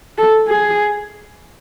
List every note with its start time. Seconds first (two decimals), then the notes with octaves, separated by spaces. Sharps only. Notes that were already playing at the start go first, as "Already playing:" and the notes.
0.18 A4
0.48 G#4